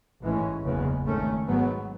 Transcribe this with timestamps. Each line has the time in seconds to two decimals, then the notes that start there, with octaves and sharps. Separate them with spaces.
0.22 A1 G#2 E3 G#3 C#4
0.63 F#1 E2 C#3 G#3 B3
1.05 G#1 G#2 D#3 A3 C#4
1.46 G#2 F#3 B3